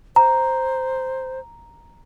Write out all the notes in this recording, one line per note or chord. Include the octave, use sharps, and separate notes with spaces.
C5 A#5